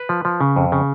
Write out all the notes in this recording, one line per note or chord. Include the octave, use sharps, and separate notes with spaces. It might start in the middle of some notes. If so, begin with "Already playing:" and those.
Already playing: B4
F3
F3
C#3
F2
C#3